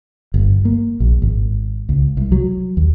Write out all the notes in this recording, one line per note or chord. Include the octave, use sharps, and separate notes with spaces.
G1
A#3
A#1
G#1
C#2
C2
F#3
D#2